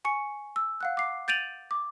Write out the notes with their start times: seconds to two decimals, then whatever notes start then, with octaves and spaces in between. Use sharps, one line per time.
0.05 G#5 C#6 C#7
0.56 E6
0.81 F5 F#5 F#6
0.97 D6 C7
1.28 G6 A6 D7 D#7 F7 F#7
1.71 D6